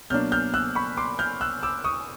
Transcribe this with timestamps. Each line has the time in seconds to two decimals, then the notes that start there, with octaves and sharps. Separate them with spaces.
0.10 B2 F#3 A#3 D4 F6 G6
0.32 F6 G6
0.54 E6 F#6
0.75 B5 C#6
0.97 C6 D6
1.19 F6 G6
1.41 E6 F#6
1.63 D6 E6
1.84 C#6 D#6